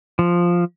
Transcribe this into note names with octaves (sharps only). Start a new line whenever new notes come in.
F3